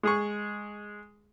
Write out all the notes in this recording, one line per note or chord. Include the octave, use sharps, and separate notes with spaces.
G#3 G#4 C#6